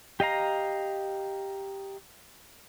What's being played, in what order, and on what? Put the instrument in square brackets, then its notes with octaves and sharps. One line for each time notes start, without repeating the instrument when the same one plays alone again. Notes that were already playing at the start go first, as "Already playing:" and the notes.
[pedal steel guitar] G4 D#5 F5 A#5